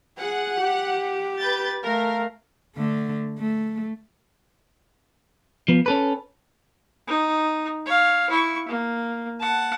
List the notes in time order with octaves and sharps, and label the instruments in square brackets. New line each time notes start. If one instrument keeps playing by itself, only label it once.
[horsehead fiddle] G#4 [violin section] F#5
[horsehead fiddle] G4
[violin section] B4 G6 A6
[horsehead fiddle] A3 F5 [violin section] A#4
[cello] D3 A3
A3
[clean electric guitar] F3 B3
C#4 A4 B4
[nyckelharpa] D#4
C#5 F5
E4 C#6
A#3
F#5 A5